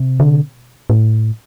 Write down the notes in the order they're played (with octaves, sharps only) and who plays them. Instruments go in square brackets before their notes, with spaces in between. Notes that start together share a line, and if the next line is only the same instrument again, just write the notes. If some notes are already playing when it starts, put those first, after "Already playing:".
Already playing: [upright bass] C3
[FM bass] D3
A2